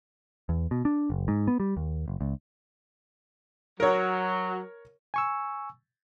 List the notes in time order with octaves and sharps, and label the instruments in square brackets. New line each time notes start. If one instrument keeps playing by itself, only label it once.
[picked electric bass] E2
B2
D4
F#1
G#2
B3
G3
D#2
F#1
C#2
[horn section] F#3 [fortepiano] A#4 C#5
[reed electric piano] G#5 C#6 E6